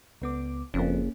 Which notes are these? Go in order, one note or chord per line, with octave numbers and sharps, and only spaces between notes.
C#2 B3 D6
F#1 F2 A#3 C#4